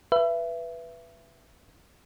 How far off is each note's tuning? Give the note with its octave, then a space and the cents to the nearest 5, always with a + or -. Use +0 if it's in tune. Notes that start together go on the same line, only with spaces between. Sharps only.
B4 +0 E5 +30